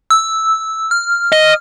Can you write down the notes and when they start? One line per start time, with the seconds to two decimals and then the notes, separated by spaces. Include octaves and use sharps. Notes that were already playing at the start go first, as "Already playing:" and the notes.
0.10 E6
0.91 F6
1.32 D#5